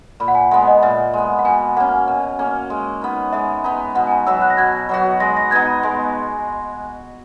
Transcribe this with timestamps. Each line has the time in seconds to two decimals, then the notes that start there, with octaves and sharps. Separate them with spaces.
0.20 A#2 B5
0.28 F#5
0.35 G#5
0.51 G#3 B3 F#5
0.67 D#5
0.82 A#2 E5
1.13 G#3 B3
1.39 F#5
1.45 B2 G#5
1.77 A#3 C#4 F#5
2.07 B2
2.39 A#3 C#4
2.70 G#3
3.01 B3 D#4
3.33 G#3 E5
3.64 B3 D#4
3.95 B2 F#5
4.07 G#5
4.12 A#5
4.27 F#3 B3 F#4 E6
4.42 F#6
4.50 A#6
4.57 B2 G#6
4.89 F#3 B3 F#4
5.20 G#3 A#6
5.37 A#6
5.51 B3 D#4 G#6
5.67 B5
5.83 G#3